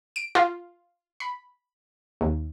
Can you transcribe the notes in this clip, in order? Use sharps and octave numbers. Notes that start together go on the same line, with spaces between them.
D7
F4
B5
D#2